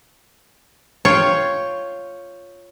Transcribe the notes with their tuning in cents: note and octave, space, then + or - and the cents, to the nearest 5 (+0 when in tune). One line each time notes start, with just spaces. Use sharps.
F4 +0 C#5 +0 G5 +0